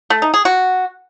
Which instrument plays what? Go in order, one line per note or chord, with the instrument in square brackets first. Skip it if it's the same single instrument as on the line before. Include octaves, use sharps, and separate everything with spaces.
[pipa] A3
D#4
G#4
F#4